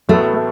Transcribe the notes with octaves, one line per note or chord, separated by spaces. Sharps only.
A1 A2 F#3 A3 B3 A4